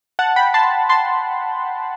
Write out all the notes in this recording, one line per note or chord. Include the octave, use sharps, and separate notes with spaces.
F#5 A5
G5 B5
A5 C6
A5 C6